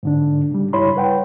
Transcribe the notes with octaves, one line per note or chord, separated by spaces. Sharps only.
G#2 D3 D4
C#3 G3
G2 G3 E4 C#5 B5 C6
B4 F#5 G5